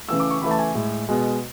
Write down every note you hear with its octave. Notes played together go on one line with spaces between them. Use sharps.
C#3 E3 A3 E6
D6
C#6
C#3 E3 A3 B5
A5
G#5
A2 G#3
B2 G#3